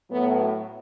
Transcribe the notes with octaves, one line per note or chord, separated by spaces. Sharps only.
A2 F#3 B3